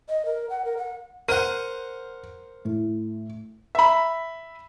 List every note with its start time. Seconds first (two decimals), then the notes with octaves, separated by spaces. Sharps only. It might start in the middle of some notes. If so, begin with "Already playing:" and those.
0.09 D#5
0.25 A#4
0.50 F#5
0.65 A#4
0.77 F#5
1.29 A#4 C5 F#5 D#7
2.65 A2
3.75 E5 B5